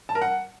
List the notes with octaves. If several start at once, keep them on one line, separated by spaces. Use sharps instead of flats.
A5
A#4
F#5